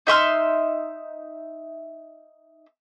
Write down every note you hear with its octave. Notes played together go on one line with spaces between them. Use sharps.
D#4 E5 C6 F6